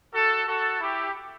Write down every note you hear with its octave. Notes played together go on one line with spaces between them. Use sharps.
F#4 A4
F#4 A4
E4 G4